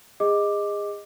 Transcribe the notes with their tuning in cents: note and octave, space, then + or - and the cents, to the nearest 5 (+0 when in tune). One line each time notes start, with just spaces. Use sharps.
G#4 -30 D#5 +0 D6 +5